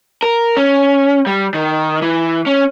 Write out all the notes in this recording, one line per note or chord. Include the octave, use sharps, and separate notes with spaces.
A#4
C#4
G3
D#3
E3
C#4